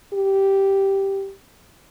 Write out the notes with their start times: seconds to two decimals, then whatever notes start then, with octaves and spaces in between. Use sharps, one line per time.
0.13 G4